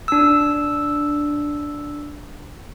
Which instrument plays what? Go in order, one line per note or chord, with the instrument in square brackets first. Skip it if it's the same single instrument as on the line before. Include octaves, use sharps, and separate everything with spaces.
[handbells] D4 E6